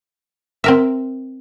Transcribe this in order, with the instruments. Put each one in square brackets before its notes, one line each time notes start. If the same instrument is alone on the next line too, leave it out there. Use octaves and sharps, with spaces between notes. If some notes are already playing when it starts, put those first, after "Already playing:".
[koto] C4 A#4 E5